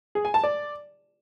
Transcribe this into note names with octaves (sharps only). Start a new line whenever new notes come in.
G#4
G#5
A5
D5